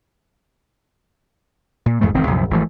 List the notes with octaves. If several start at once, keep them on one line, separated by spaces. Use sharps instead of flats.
A#2
F2 G#2 E3 A3
E1 D#3 C4
C2 F#2 A#2 F3
G#1 E3 F3 A3